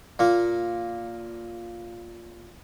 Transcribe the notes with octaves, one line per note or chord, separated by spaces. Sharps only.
A#2 A#3